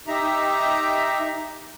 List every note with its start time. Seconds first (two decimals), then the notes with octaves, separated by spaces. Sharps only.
0.08 D#4 G4 E5 A#5